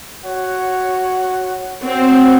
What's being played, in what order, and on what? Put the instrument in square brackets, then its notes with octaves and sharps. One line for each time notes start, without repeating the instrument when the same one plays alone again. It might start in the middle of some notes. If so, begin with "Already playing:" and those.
[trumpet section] F#4 C#5 F#5
[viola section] C4 [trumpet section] F#4 C#5 F#5